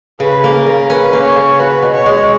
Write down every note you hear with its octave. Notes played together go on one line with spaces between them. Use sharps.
C#3 B4
A#3
A#4
C#3
C#4 B4
A#3
C#5
C#3
F#4 B4
B2
C#5
G#3